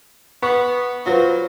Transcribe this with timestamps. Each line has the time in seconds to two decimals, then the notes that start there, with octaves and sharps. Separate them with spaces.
0.43 B3 C#6
1.06 F#3 F4 B4 C5